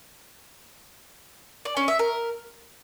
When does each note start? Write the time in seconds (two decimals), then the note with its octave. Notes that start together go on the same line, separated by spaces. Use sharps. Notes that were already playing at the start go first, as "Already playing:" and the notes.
1.65 D5
1.77 C#4
1.88 E5
1.99 A#4